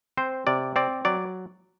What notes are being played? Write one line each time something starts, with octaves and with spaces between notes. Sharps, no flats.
C4 C5
C3 D5
C4 D5
F#3 D5